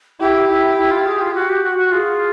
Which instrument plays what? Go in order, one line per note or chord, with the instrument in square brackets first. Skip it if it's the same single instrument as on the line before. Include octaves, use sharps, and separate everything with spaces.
[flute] E4 [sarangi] G4
[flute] E4
E4
F4
G#4
F4
F#4
G4
F#4
F#4
[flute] F4 [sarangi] G#4